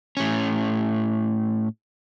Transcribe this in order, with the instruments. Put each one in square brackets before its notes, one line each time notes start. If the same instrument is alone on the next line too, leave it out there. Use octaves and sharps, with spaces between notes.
[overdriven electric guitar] A2 C#4